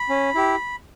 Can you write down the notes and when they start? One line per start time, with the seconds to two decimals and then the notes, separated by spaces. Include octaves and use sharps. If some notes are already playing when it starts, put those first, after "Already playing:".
Already playing: B5
0.09 C#4
0.35 E4 G4